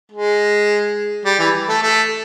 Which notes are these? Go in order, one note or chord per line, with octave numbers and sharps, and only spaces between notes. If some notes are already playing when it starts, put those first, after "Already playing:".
G#3
G3
E3
A3
A3